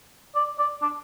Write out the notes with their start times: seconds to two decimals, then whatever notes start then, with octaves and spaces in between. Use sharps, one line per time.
0.35 D5
0.59 D5
0.82 D4